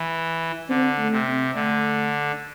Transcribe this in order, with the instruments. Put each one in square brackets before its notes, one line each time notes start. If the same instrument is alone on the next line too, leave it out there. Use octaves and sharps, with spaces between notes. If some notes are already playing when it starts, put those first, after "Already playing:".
Already playing: [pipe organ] E3
[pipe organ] D3 [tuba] C4
[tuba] A3
[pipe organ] C3
[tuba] C4
[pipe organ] D3 [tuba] A3